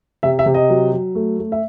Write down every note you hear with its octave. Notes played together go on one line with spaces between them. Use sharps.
C3 E5
E5
C3
D#5
F#3
F#3
A3
A3
E5